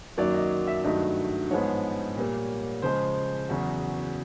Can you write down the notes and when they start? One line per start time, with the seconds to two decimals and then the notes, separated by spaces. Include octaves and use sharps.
0.17 F#2 D#3 F#3 A#3 D5
0.34 D#5
0.67 E5
0.84 G2 D#3 F#3 A3 D#5
1.50 G#2 F3 G#3 B3 C#5
2.17 A#2 G3 A#3
2.82 C#3 F3 G#3 C5
3.49 E2 C#3 F#3 F#4